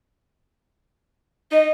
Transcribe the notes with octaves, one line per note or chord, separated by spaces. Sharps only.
D#4 D#5